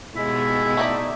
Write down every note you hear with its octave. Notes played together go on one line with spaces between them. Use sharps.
D#2 B2 G#3 E4
A3 D#4 D5 E5